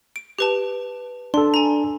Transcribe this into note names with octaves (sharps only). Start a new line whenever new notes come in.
D7
G4 B4 A5
D4 A4 C6
G#5 A#5